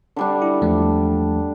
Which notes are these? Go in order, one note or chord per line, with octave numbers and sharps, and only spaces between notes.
D3 G3 D4
E4
E2 F3 A3